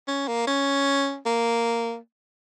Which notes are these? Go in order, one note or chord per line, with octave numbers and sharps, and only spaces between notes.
C#4
A#3
C#4
A#3